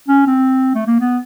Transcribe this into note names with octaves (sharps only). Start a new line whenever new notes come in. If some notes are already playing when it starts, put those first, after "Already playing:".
C#4
C4
A3
A#3
B3